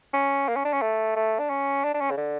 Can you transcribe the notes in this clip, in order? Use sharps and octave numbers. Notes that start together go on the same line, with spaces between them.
C#4
A#3
C#4
D4
C#4
A3
A3
D4
C#4
D4
D4
C#4
C#3
D3